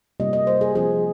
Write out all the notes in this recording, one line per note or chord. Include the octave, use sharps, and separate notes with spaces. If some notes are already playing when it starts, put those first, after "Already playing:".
C3 G3 A#3 F4 D#5
D#5
C5
G#4
F3 C4 F4 G#4